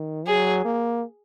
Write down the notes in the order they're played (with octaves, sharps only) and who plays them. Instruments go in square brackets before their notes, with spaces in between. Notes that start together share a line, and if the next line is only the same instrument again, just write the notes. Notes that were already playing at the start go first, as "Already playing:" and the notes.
Already playing: [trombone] D#3
[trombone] F#3 [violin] G#4
[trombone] A#3